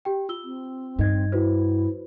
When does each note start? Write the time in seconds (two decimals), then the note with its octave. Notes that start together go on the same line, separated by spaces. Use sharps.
0.05 G4 G5
0.29 F4 E6 G7
0.44 C4
0.99 G2 D#4 D#5 G#6
1.32 E4 F#4 B4 C5